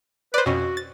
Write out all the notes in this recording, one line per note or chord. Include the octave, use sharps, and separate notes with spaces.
B4 C5 D5
F2 B2 C#4 F#4
A6